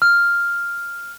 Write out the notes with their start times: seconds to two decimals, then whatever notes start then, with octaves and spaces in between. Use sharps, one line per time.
0.02 F6